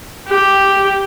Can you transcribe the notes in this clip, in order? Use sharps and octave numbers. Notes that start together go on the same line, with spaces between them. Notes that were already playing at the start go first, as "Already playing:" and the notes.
G4